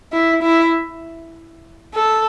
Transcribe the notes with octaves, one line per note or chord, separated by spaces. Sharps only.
E4
E4
A4